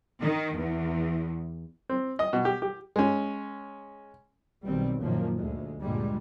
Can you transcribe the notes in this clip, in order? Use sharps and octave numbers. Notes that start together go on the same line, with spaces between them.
D#3
E2
C4
D#5
B2
G4
G4
G#3 C#4
B1 B2 D#3 G3 C4
F#2 A#2 D#3 F3 A#3
D2 G#3
G2 A#2 D3 G3 G#3